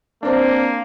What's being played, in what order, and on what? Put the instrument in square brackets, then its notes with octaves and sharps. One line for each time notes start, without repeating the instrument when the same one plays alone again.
[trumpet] A#3 [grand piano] C4 D4